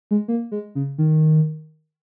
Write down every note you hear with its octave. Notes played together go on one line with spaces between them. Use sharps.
G#3
A#3
G#3
C#3
D#3